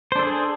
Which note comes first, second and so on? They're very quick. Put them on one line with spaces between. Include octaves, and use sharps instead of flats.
C5 D4 A4 G#4